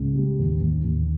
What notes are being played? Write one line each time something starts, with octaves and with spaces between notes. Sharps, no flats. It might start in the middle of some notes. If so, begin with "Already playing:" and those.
Already playing: C#2
G3
D#2
D#2
D#2